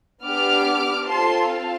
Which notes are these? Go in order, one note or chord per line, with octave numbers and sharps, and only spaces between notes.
B3 D4 G4 D6 F6
C4 F4 A4 A5 C6
F5 A5